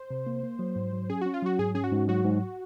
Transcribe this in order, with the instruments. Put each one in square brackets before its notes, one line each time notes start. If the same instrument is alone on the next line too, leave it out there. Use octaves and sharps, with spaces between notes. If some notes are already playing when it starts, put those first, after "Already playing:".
Already playing: [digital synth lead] C5
[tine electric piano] C3
A#3
A#3
F#3
G#2
F#3
[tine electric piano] C#4 [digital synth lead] G#4
[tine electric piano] C#4 [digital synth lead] F#4
[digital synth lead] F4
[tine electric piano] F#3 [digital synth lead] F#4
[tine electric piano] G#2 [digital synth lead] G#4
[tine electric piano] C#4 [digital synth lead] G#4
[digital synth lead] F#4
[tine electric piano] G#2
[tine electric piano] F#3 [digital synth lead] F#4
[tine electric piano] G#2